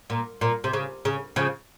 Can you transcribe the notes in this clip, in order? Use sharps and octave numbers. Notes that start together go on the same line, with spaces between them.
A#2
A#2
C3
C#3
C#3
C#3 F3